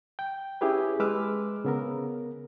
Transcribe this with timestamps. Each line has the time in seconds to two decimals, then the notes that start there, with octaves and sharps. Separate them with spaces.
0.19 G5
0.61 C#4 E4 G4 G#4 B4
1.00 G#3 B4 D6 E6 F6
1.65 C#3 B3 A#4